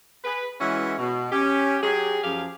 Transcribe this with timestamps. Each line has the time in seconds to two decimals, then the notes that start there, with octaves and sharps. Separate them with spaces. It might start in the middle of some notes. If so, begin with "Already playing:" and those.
0.24 G#4 B4
0.59 E3 G#3 C#4 E4 F#4
0.98 B2
1.32 C#4 G4
1.82 F#3 G4 G#4
2.23 F#2 F3 G4 G#4 F5